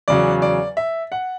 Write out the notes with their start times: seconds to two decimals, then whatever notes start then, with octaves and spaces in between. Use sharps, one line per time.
0.08 E2 C#3 F#3 D5
0.42 D5
0.77 E5
1.12 F#5